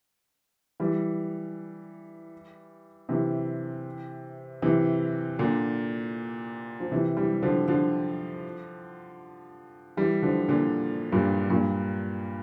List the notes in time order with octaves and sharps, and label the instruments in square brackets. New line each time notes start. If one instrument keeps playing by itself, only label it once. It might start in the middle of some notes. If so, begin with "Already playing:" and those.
[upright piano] E3 G3
C3 E3
C3 E3
A#2 D3
F3
C3 E3
E3 G3
D3 F3
D3 F3
E3 G3
D3 F3
A#2 D3
G2 A#2
G2 A#2